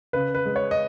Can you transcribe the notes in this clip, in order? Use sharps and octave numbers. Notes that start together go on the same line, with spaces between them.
C#3 B4
B4
G#3
C#5
D#5